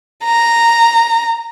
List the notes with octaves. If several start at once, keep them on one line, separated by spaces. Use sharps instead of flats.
A#5